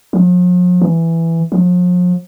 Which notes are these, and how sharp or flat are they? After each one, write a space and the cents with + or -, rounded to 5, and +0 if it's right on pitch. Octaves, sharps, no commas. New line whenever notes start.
F3 +45
E3 +5
F3 +40